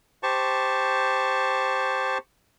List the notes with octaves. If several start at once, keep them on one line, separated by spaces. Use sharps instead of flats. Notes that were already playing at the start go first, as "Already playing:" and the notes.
G4 C5 A5 C#6